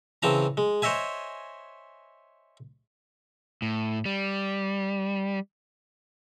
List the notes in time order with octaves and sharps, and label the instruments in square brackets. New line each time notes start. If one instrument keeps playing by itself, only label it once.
[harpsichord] C#3 E3 C4 A5 A#5
G#3
C5 C#5 D#5 E5 G#5
[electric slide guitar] A2
G3